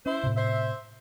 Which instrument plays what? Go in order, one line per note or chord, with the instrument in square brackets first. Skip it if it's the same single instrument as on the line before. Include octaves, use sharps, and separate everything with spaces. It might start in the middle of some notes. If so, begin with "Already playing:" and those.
[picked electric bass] C#4 [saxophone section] E4 C5
[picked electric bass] A2 C3
[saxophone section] C5 E5